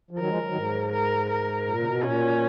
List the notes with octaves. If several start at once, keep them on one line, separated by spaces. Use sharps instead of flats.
F3
D#3 F#3 A#4
F3 G#3
D#3 F#3
G#2
A#4
A#4
A#2
C#3
B2
A#2 C#4